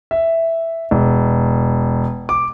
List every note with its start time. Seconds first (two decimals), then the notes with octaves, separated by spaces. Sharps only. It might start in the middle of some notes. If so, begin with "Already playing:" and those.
0.11 E5
0.91 E1
2.29 D6